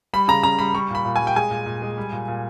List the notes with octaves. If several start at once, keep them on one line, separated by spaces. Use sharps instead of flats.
G3 B5
C#3 A#5
C#3 A#5
G3 B5
G3 C#6
A#2 B5
A#2
G3 G#5
G5
G#3 G#5
A#2
A#2
G#3
G3
A#2
A#2